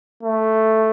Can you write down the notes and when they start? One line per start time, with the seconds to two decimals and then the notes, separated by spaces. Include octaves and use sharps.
0.23 A3